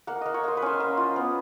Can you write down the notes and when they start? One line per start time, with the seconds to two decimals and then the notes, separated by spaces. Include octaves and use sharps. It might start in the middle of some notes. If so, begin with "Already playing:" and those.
0.07 A#3 F#5
0.21 A#3 D#5
0.34 C#5
0.44 A#3 C5
0.57 B4
0.62 C#4 C5
0.80 A#3
0.97 F4
1.16 B3